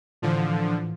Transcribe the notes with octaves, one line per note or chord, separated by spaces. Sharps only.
A2 D3 E3 F3